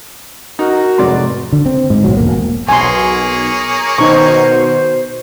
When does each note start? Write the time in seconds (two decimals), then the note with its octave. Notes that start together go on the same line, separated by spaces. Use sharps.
0.59 D#4 F#4 A#4
0.98 F1 G#2 F#3 D5 C6
1.52 D3
1.66 C4
1.90 G#2
2.04 B1 F#3
2.17 E1 A#3
2.69 B1 B2 A#3 G#4 C#5 G#5 C6
3.98 B2 D#3 D#4 C5 C#6